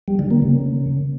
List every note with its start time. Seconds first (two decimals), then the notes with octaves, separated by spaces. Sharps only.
0.08 G3
0.19 D3
0.31 A#3
0.42 C#3